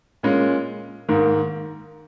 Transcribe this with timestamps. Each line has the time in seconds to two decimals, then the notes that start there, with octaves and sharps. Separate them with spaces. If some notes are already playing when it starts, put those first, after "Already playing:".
0.23 A#2 G#3 C#4
1.09 G#2 D#3 A#3